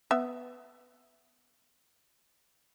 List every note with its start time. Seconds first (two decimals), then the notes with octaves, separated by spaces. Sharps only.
0.11 B3 E5